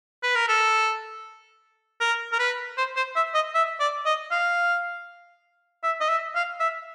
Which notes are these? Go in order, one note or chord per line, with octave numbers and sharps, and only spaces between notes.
B4
A#4
A4
A#4
A#4
B4
C5
C5
E5
D#5
E5
D5
D#5
F5
E5
D#5
E5
F5
E5